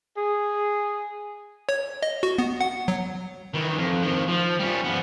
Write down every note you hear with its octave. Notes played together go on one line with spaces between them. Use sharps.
G#4
C#5
D#5
F#4
B3
F#5
F#3
D#3 E3
F2
D#3 F3
F3
G3 C#4
F3 B3